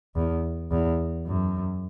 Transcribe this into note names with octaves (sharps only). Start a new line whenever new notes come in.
E2
E2
F#2